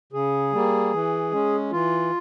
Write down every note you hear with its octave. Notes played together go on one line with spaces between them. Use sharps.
C#3 G#4
G3 A#3
E3
G#3 C#4
E3 F4